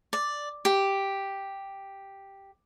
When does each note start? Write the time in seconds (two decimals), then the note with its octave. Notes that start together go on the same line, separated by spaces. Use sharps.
0.13 D5
0.65 G4